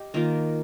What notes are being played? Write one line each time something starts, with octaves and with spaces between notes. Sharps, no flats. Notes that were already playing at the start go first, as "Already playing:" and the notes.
Already playing: G4 D#5
D#3 A#3 F4 A#4